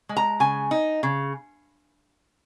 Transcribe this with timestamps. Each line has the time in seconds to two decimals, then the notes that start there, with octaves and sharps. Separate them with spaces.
0.09 G#3
0.17 A#5
0.40 C#3 G#5
0.71 D#4
1.03 C#3